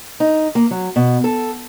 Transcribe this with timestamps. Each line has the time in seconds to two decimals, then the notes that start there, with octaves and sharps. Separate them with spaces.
0.20 D#4
0.55 A#3
0.71 F#3
0.96 B2
1.24 A4